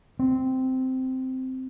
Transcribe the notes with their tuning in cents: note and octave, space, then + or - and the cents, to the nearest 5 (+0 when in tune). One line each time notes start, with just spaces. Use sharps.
C4 -10